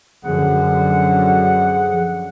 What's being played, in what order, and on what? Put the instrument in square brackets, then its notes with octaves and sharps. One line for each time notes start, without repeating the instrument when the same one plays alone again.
[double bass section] F#2 D3 [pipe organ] F3 G#4 [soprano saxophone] F#5